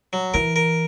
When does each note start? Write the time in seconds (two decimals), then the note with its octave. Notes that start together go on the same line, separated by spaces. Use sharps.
0.13 F#3
0.34 E3 A#4
0.56 A#4